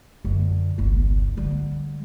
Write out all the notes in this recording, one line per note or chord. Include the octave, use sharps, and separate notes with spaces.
F#2 D3
G1 C2
D3 G3